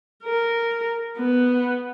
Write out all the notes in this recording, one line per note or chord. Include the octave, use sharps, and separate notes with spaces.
A#4
B3